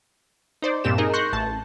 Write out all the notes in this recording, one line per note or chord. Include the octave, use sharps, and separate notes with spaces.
D#4 C5 D5
G2 A#2 C4 G4 E7
D#4 G#4 A#4 D#5
C6 C#6 F#6 G6 A#6
A1 A5